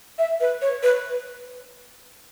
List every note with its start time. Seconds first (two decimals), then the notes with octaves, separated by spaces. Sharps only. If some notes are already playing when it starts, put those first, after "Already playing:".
0.18 E5
0.40 B4
0.62 C#5
0.83 B4